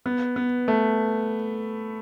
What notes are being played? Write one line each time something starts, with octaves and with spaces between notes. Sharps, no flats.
B3
B3
A3